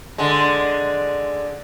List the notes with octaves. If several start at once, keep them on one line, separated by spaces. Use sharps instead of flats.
D3 G#3